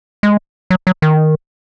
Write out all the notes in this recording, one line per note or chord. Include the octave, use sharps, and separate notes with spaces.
G#3
F#3
F#3
D#3